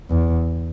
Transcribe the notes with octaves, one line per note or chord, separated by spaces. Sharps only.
E2